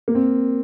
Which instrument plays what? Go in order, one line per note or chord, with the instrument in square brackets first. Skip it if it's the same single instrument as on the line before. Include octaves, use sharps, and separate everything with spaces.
[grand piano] A#3
C4